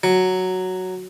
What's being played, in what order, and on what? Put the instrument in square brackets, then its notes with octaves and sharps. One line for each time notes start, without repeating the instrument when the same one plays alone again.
[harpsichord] F#3